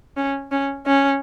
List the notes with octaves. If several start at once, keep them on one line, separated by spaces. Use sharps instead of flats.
C#4
C#4
C#4